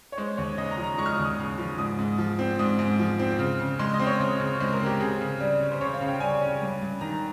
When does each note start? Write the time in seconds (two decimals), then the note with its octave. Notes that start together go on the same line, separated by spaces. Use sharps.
0.12 C#5
0.18 G#3 C5
0.37 D#2 C#5
0.58 C#3 D#5
0.71 A#5
0.78 F3
0.84 A#5
0.98 G#3 C#6
1.06 F6
1.12 D#6
1.18 D#2
1.25 D#6
1.38 C#3
1.58 F3
1.78 G#2 D#6
1.99 G#2
2.18 F3
2.39 C4
2.59 G#2 D#6
2.79 G#2
2.99 F3
3.19 C4
3.39 C#3
3.59 C#3
3.79 G#3 C6
3.93 D#5
4.00 C4
4.07 C#5
4.20 C#3
4.40 C#3
4.60 G#3 C5
4.73 A#4
4.80 C4
4.86 G4
5.00 C#3 G#4
5.21 C#3
5.40 G3
5.60 C#4
5.72 C5
5.81 C#3 C#5
5.94 F5
6.01 C#3
6.08 G5
6.20 G3 G#5
6.41 C#4
6.62 G2
6.82 G2
7.01 D#3 A#5